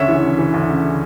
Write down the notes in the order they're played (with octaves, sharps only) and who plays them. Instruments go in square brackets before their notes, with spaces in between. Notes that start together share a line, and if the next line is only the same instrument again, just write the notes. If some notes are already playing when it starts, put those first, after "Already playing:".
Already playing: [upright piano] D2 C#3 [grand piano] C#5 E5
[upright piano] E3
C#3
E3
D2
C#3